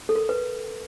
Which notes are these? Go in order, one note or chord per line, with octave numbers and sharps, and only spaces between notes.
A4
A#4
B4